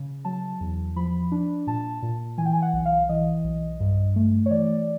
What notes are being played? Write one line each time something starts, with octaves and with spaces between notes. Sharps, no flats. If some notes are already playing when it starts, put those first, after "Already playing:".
Already playing: C#3
F#3 A5
E2
F3 B5
D4
A#2 A5
A#2
E3 G#5
G5
G#5
F#5
B1
F5
E3 D#5
B1
G2
A3
C#5
E3 D5